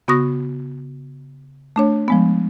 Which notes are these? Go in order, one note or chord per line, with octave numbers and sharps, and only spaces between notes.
C#3 B3 F#4 C#6 D#6 A#6
A3 D4 C#5
F3 G#3 B3